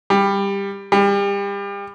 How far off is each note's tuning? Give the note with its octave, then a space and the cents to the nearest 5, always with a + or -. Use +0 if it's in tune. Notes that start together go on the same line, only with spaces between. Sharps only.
G3 +15
G3 +30